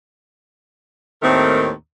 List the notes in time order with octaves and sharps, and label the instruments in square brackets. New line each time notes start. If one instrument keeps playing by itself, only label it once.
[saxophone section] D#2 A2 D#3 A3 C4 A#4